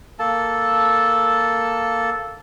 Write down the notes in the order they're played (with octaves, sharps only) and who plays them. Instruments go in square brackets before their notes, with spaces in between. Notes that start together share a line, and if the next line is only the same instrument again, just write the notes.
[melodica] A#3 A4 A5